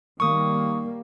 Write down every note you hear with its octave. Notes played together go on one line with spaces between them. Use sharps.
D#3 G3 A#3 C#6 D#6